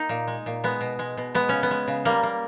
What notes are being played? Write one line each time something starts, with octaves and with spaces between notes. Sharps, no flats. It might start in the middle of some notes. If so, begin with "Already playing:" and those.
Already playing: A#3 D#4
A#2
G#3
A#2
G#3 B3
B2
G#3
B2
G#3 B3
C#3 C#4
B3
G#3
C#3
G3 A#3
A#3